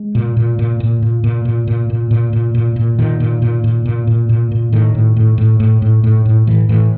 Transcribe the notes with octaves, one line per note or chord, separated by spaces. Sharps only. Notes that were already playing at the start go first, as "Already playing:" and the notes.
Already playing: G#3
A#2
A#2
A#2
A#2
A#2
A#2
A#2
A#2
A#2
A#2
A#2
A#2
A#2
A#2 D#3
A#2
A#2
A#2
A#2
A#2
A#2
A#2
A2 D#3
A2
A2
A2
A2
A2
A2
A2
A2 E3
A2 E3